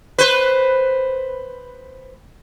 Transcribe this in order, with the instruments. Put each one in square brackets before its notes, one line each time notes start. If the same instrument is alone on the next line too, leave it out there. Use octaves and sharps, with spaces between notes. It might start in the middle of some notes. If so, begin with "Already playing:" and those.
[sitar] B4 C5